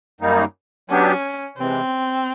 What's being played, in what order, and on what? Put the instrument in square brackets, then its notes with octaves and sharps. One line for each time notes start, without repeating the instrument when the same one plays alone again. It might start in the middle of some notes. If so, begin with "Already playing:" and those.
[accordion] F#2 D#3 G3 A#3 D#4
[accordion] F#3 B3 D4 G4 [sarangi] C#4
[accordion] C3 E3 G#3 [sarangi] C4